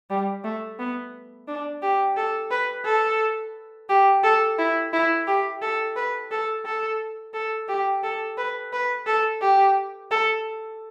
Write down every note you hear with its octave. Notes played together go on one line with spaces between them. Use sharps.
G3
A3
B3
D4
G4
A4
B4
A4
G4
A4
E4
E4
G4
A4
B4
A4
A4
A4
G4
A4
B4
B4
A4
G4
A4